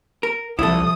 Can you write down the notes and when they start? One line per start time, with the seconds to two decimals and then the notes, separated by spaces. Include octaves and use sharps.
0.23 A#4
0.59 C2 C3 F3 E4 A4 D#6